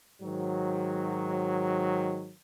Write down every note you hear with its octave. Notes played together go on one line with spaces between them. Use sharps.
G#2 D#3 F#3